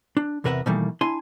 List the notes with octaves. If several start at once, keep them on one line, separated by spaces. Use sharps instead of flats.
D4
E2 C3 A#4 B4 E5 F#5
B2 D#3 E3 G3 A3 A#3
D4 E4 G#5 C6